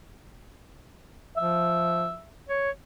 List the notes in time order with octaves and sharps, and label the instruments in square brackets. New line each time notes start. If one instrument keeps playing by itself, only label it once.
[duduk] F3 [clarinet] E5
[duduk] C#5